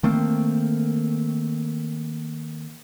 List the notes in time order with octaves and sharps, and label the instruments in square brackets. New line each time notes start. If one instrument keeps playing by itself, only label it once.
[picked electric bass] D#3 A3 A#3 C4